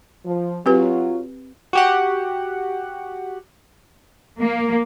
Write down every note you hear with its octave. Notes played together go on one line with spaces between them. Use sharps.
F3
F#3 C4 F4 G4 B4
F#4 G4 F#5
A#3